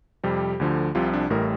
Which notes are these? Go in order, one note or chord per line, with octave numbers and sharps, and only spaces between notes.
F2 C3 G3 G4
D2 D3 F3
C2 C3 F3 F4
D4
A1 A2 G3 A#4